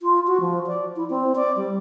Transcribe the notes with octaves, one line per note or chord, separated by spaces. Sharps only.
F4
F#4
F3
D5
E4
C4
D5
G3